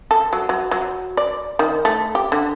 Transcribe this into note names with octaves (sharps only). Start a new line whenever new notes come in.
A4
F#3
F#3
F#3
D5
D#3
A3
G4
D3